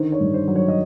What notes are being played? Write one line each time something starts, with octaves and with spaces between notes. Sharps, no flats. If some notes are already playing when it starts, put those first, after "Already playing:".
Already playing: D3 D#3 C5
C#5
G2
C5
F#3
C#5
D#5